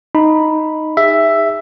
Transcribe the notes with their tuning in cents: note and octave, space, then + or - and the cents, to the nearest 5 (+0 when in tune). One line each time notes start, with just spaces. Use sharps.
D#4 +0 B5 +0
G#4 -35 E5 +5